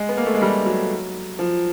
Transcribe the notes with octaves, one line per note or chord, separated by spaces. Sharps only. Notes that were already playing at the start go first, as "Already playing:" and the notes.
Already playing: G#3
B3
A#3
A3
G#3
G3
F#3
F3